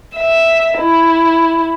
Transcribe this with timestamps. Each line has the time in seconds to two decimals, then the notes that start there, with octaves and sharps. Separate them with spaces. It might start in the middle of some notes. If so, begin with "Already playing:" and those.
0.15 E5
0.78 E4